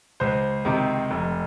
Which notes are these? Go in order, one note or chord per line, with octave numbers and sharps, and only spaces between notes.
C#2 C5
C3 D#3
F1